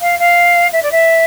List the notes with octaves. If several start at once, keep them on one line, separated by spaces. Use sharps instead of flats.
F5
F5
E5
D5
E5